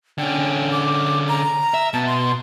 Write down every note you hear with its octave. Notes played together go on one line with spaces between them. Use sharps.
D3 C#4 G5
D6
A#5
E5
B2 A5
C6